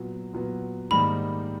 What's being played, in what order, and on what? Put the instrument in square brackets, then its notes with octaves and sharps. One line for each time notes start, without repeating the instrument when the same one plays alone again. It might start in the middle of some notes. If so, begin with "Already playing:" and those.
Already playing: [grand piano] A#2 F#3 B3
A#2 F#3 B3
[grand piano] G#2 D#3 G3 A#3 D#4 [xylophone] B5